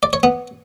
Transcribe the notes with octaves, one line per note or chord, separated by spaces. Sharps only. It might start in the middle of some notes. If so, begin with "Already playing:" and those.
D5
C#5
B3